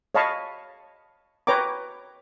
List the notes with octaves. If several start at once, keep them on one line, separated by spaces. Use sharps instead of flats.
C#5 D#5 F5 A5 B5 C#6
B4 C#5 G5 A#5 D6